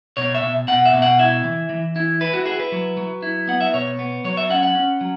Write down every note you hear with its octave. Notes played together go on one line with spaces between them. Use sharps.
B2 C#5
E5
B2
B2 F#5
E5
B2
F#5
E4 E5
E3
E3
E4
E4 B4
F#4
E4 G#4
B4
F#3
F#3
E4
B3 F#5
E5
B2 C#5
B3
F#3 C#5
E5
C#4 F#5
F#5
C#4
F#3